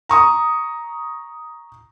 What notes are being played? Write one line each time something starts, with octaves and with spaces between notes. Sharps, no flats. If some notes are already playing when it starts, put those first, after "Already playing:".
A#5 C#6 D#6